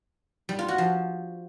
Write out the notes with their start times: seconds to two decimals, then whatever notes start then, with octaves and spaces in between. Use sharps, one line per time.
0.49 G3
0.59 F4
0.68 F#4
0.78 F3